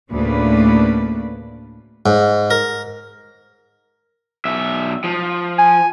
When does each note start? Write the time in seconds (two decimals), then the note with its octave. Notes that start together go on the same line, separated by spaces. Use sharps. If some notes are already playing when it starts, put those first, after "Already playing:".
0.11 D2 A2 C#3 A#3 D4 B4
2.06 G#2
2.50 A#4
4.45 B1 E5
5.04 F3
5.58 G#5